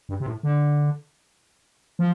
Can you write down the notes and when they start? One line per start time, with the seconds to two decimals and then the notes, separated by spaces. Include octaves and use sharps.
0.09 G2
0.20 C3
0.26 A2
0.43 D3
1.99 F3